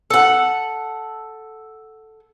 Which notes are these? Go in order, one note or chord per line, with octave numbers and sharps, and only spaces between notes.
A4 F#5